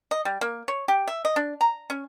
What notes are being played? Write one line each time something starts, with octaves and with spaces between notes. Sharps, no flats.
D#5
G3
A#3
C#5
G4
E5
D#5
D4
A#5
C#4